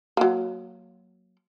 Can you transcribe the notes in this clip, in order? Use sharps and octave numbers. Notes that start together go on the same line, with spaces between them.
F#3 A#3